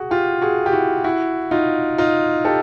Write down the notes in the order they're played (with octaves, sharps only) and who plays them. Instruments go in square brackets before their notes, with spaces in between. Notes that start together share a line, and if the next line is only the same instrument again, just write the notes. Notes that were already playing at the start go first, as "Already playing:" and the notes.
Already playing: [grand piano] F#4 G#4
F4 G4
F#4 G#4
G4
E4 F#4
E4 F#4
D#4 F4
D#4 F4
G4 A4